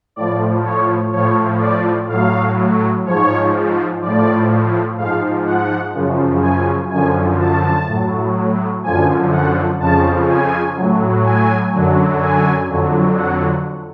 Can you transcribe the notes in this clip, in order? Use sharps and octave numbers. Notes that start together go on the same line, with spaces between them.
A2 F3 D5
C#5
A2 F3 C#5
D5
A2 F#3 F5
G#2 F3 C#5
A2 F3 D5
G#2 F3 F5
F#5
F#2 C#3 F3
G#5
F#2 D3 F3 G#5
A5
A2 F#3
F#2 D3 F3 G#5
F#5
F2 C#3 F3 A5
G#5
A2 F#3
G#5
F#2 D3 F#3
G#5
F2 D3 F#3
F#5